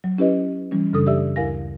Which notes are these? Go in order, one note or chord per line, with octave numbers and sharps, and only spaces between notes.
F#3
C#4 E4 G4 B4 C#5 D#5
E3 G3 C#4
F#2 C#3 G3 D4 A4 D#6
G4 D5 E5 E6
D2 E4 A#4 F5 G#5 A#6